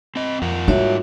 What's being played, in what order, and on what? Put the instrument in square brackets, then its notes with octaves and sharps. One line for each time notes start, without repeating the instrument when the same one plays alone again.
[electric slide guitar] C4 D#5
[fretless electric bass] F2 [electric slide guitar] F4 A#4 F#5
[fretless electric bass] G#2 G3 [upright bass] D#4 [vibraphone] F#4 C#5 E5